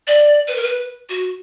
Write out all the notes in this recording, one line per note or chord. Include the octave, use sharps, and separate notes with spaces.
D5
B4
A#4
B4
F#4